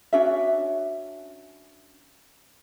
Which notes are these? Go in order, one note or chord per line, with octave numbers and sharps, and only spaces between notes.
C#4 D4 F#4 E5